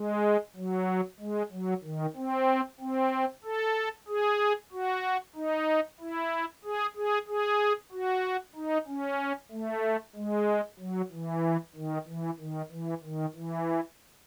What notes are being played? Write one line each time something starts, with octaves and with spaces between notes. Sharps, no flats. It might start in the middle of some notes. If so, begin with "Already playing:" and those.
Already playing: G#3
F#3
G#3
F#3
D#3
C4
C4
A4
G#4
F#4
D#4
E4
G#4
G#4
G#4
F#4
D#4
C#4
A3
G#3
F#3
E3
D#3
E3
D#3
E3
D#3
E3